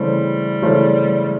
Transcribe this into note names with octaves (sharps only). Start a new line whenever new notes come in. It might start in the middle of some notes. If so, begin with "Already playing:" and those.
Already playing: C#3 E3 G3 A3 C4
C#3 E3 A3 C4